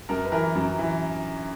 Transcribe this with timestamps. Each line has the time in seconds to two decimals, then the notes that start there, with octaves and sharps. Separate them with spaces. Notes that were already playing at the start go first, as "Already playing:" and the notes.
0.09 F#2 A#4
0.25 B4
0.32 E3 A#4
0.55 F#2
0.79 E3